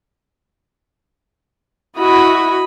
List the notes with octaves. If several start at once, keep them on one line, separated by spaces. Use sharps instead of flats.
E4 F#4 D#5 B5